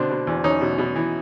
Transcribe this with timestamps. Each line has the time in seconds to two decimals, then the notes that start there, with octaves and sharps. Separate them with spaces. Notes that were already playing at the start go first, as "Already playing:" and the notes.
Already playing: B2 D3 C4 D4
0.10 B2
0.27 E2
0.44 E2 C#4 D#4
0.61 B2
0.78 B2
0.96 E3